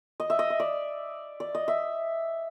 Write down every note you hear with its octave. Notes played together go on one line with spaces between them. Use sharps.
D#5
E5
D#5
E5
D5
D5
D#5
E5